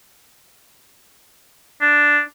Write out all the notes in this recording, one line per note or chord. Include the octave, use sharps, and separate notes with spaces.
D4